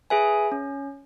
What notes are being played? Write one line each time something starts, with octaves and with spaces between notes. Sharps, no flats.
G#4 B4 E5 G#5
C#4